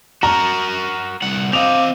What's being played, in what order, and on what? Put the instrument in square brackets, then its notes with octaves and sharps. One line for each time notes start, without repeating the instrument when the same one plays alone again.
[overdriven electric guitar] F#4 A#4 [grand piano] A#5
[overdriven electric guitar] C2 F#5
[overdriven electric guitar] C4 D#5 [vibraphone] F5 D6 [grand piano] F7